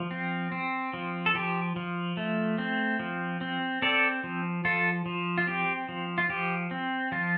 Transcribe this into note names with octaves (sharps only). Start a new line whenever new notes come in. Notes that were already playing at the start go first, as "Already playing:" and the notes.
Already playing: F3
C4
C4
F3
A4
F3 G4
F3
A3
C4
F3
C4
C4 A4 D5
F3
F3 F4 A4
F3
F4
C4 G4
F3
F4
F3 G4
C4
F3 F4